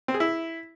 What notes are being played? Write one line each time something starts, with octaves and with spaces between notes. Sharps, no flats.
C4
G#4
E4